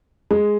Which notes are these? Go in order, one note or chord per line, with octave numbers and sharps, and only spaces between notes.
G#3